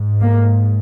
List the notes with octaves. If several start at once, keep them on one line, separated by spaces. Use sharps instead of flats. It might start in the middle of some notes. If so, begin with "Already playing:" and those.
Already playing: G#2
A#3